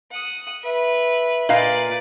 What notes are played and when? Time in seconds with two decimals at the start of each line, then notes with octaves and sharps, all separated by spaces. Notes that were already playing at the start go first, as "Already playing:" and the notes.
0.11 F#5 D#6
0.62 B4 E5
1.49 A#2 B4 D5 D#5 F5